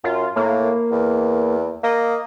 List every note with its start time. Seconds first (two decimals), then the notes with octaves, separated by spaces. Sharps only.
0.04 F#2 F4
0.36 A2 A#3
0.91 E2
1.83 A#3 D#5